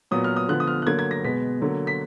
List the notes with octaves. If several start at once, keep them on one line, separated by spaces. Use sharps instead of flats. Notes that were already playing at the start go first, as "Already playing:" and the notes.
A#2 F#3 B3 D#6
F6
D#6
D3 F3 B3 F#6
D#6
F6
F#6
D3 F#3 A#3 G#6
G#6
A#6
B2 G#3 B3 B6
D3 F#3 A#3
B6